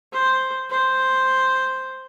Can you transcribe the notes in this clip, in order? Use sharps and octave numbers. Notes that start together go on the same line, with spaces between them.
C5
C5